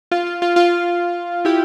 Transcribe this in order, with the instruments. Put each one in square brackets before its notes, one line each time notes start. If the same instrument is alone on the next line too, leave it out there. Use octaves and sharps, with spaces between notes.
[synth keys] F4
F4
F4
F4
E4 G4